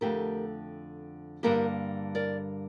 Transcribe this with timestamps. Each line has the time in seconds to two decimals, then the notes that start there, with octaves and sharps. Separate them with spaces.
0.01 F2 D3 A3 G4 A#4
1.43 G2 D3 G3 A#3 G4 A#4
2.15 A#4 D5